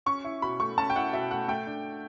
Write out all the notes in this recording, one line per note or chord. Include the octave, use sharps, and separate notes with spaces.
C#4 C#6
E4
B2 B5
A3 C#6
C#4 A5
G5
E4 F#5
B2 E5
A3 F#5
A3 G5
D4